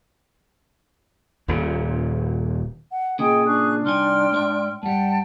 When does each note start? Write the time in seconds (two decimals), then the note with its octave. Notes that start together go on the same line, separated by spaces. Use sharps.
1.48 D#1 A#2 C#3
2.91 F#5
3.19 A#2 C#3 G#4 D#5 G5 D#6
3.46 D4 G#4 C#6 F#6
3.85 C2 D#4 D5 G5 G#5 C6 F6
4.32 G#2 C#5 E5
4.83 G2 G3 F#5 G5 A5